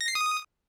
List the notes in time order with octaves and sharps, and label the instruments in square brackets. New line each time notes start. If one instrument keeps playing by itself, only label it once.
[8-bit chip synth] A#6
C7
D#6